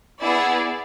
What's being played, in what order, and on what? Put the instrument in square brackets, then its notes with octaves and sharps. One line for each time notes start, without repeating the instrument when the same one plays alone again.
[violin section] B3 E4 G#4 D5